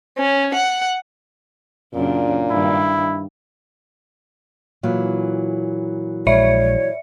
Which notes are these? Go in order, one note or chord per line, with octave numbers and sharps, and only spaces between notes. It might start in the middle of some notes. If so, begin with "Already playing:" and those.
C#4
F#5
F#2 A#2 C#3 D4
G2 D#3 E4
A#2 E3 F#3
A#1 G#3 C#5 D5 E5 C#7